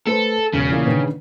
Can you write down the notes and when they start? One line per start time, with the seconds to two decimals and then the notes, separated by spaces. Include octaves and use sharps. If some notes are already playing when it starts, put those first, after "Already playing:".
0.07 A3 A4 B4 C5
0.54 E1 C#3
0.70 A#2 E3 A#3
0.86 D3 D#3 B4